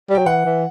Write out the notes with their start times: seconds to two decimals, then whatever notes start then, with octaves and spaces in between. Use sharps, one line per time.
0.10 G3
0.15 F#3 G5
0.26 E3 F#5
0.45 E3